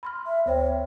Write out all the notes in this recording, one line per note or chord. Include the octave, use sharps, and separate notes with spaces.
B5 C6 F6
E5
D2 C5 C#5 G5